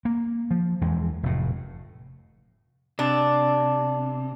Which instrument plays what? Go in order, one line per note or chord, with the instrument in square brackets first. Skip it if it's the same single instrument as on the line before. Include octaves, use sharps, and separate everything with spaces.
[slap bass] A#3
F3
E2 E3 F3 G#3
F1 A2
[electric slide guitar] C3 [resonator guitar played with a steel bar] D4